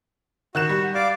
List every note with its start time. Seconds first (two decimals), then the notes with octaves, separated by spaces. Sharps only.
0.55 D#3 F#4 F#6 E7
0.69 G3
0.95 D5 F5 D6